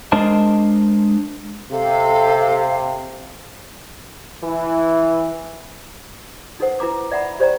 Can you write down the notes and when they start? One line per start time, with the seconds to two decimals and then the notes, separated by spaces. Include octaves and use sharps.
0.12 G#3 D4 A#4 C5 D#5 A5
1.72 C3 A4 F5
4.42 E3
6.60 D#4 A4 B4 C5 F#5 E6
6.79 E4 B4 A#5 D6 E6
7.11 D5 E5 F#5 A#5 B5
7.39 G4 C5 D5 G5 A#5